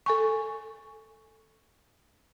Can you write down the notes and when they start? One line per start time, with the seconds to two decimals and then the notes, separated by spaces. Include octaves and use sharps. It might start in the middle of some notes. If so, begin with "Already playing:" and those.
0.06 A4 G#5 C#6